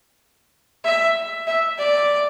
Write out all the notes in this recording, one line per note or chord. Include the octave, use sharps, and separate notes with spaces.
E5
E5
D5